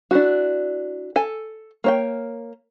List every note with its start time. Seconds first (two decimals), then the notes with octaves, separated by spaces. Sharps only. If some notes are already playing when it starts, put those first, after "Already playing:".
0.11 D4 E4 F#4
1.16 A4 G#5
1.84 A#3 C#5 G5